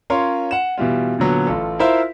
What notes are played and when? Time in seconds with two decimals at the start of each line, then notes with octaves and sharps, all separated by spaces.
0.10 C#4 F4 A#4 C#5 C6
0.51 F#5 E7
0.78 B2 E3 G3 F4
1.19 A#2 D3 F#3 B3
1.47 A1 F4 A4
1.79 E4 F4 A#4 C5 E5 F5